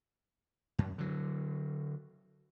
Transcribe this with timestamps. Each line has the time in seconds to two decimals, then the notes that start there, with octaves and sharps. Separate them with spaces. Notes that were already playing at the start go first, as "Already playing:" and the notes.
0.79 F#2
0.98 D3 F#3